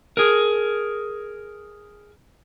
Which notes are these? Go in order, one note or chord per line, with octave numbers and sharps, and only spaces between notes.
G#4 A#4